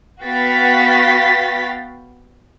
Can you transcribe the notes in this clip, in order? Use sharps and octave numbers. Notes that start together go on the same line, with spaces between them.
B3 F#4 F5 G5 A6 B6